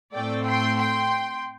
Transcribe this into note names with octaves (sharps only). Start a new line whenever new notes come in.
A2 A3 C4 D5 G5
G5 C6
G5 C6